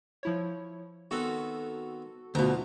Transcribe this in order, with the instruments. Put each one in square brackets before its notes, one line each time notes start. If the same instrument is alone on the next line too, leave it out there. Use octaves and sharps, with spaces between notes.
[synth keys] F3 E4 C#5
[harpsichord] D#3 B3 C4 [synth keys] F#4 A4
[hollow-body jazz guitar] D2 B2 [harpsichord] F3 D#4